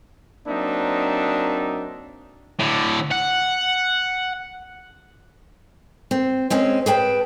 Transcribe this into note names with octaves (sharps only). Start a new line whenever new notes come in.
F#3 A#3 C4 D4 D#4 E5
A2 D3
F#5
C4
G#3 C4 C#4 G#4
G#4 B4 G5 A5